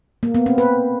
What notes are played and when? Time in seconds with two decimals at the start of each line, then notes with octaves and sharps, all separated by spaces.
0.23 A#3
0.35 B3
0.46 C4
0.58 B4